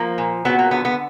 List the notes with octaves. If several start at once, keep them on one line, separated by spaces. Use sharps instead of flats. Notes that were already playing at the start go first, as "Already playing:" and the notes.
Already playing: F3 A#3
A#2
F#3 B3
A#3
D3 B3
B3